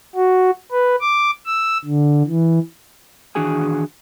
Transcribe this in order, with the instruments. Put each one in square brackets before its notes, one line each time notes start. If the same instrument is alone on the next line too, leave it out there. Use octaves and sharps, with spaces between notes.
[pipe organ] F#4
B4
D6
E6
D3
E3
[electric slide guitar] D#3 E3 D4 F#4 G#4 G#5